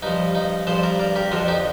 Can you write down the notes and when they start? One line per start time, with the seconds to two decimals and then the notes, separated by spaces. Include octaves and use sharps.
0.03 G2 F3 D#4
0.35 D#4
0.67 G2 F3 A4 C5
0.83 A#4 D5
0.99 A#4 D5
1.16 G4 A#4
1.32 F2 D3 F3 F4 A4
1.48 D#4 G4